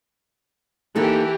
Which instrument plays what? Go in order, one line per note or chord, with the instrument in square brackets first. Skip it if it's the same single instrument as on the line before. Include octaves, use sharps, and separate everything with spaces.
[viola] E3 G4 [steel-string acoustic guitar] A#3 D#4 A4